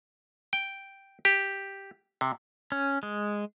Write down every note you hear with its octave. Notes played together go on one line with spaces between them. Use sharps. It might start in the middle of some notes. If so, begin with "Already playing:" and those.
G5
G4
C3
C#4
G#3